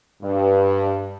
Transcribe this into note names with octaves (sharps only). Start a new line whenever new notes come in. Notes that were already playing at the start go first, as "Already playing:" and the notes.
G2